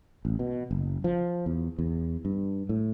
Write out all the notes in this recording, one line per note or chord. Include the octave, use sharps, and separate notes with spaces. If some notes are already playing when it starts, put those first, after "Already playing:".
A1
B2
F#1
F3
E2
E2
G2
A2